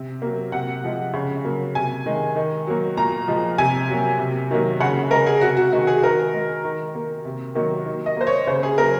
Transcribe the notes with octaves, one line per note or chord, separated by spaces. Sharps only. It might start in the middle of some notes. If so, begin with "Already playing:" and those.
Already playing: C3
F#3 A#3
C3 F#5
F3 G#3
C#3
F#3 A#3
C3 G#5
D#3 G#3
D#3
F#3 A#3
A#2 A#5
F3 G#3
C3 G#5
F#3 A#3
C3
D#3 F#3 A#3
C#3 F#5
G#3 A#4
G#4
C3 F#4
F#4
D#3 G#3 F#4
G#4
D#3 A#4
G#3
D#3
A#3
C3
D#3 F#3 A#3
D#3
D#5
A#3 C5
C#5
C#3 C5
G#4
F#3 A#3 A#4